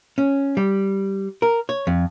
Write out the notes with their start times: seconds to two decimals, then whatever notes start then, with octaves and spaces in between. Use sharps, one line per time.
0.18 C#4
0.57 G3
1.42 A#4
1.69 C#5
1.87 F2